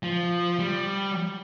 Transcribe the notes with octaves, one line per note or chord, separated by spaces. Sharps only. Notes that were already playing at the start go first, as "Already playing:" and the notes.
F3
G3